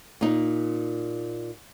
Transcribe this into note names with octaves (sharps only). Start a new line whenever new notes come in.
A#2 D#4